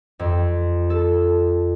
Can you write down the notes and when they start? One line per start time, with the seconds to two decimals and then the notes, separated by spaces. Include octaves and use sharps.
0.19 F2
0.90 A4